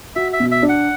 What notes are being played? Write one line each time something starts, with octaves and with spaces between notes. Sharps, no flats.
F#4 E5
E5
B2
E5
D4
F#5